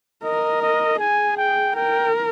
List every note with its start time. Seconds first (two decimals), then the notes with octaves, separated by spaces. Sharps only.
0.24 A#4 D#5
0.62 D#5
0.99 G#4 G#5
1.37 G5
1.75 A#4 G5